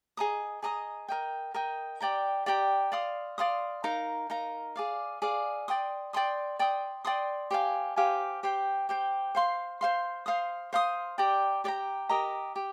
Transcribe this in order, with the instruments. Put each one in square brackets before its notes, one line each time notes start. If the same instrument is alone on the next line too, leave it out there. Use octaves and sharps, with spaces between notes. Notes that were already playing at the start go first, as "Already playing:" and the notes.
[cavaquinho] G#4 D#5 A#5 D#6
G#4 D#5 A#5 D#6
A#4 D#5 G5
A#4 D#5 G5
G4 D5 G5 A#5
G4 D5 G5 A#5
D5 F5 C6 D#6
D5 F5 C6 D#6
D#4 A#4 F5 A#5
D#4 A#4 F5 A#5
G#4 D5 F5
G#4 D5 F5
D5 G5 C6 D#6
D5 G5 C6 D#6
D5 G5 C6 D#6
D5 G5 C6 D#6
G4 C5 F5 G#5
G4 C5 F5 G#5
G4 C5 G5
G4 C5 G5
C5 F5 C6
C5 F5 C6
C5 F5 C6 D#6
C5 F5 C6 D#6
G4 D5 G5 A#5
G4 D5 G5 A#5
G4 A#4 D#5 A#5
G4